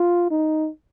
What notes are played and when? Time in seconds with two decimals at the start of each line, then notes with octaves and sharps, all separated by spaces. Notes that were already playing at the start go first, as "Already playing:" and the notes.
Already playing: F4
0.31 D#4